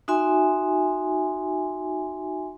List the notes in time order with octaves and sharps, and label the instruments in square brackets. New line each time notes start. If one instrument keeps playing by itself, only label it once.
[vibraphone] D#4 F#4 E5 G#5 C6